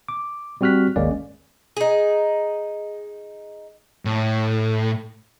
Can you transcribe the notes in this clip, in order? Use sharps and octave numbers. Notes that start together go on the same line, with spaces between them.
D6
G3 C4 F#4 F6 F#6 B6
G#1 D#2 G#3 A#3 C#4 D5
D#4 G#4
A2